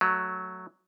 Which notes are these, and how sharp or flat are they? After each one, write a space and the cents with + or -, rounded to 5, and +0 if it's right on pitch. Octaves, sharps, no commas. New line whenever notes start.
F#3 +0 A3 +0